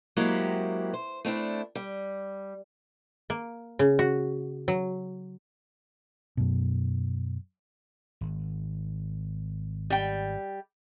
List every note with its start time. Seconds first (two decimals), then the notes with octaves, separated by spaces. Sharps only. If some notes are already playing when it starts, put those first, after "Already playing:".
0.17 F#3 G#3 A#3 C4 E4 G4
0.94 C5
1.25 A3 C4 D4 E4
1.75 G3
3.30 A#3
3.79 C#3
3.99 F#4
4.68 F#3
6.37 F#2 B2
8.21 G#1
9.90 G3 G5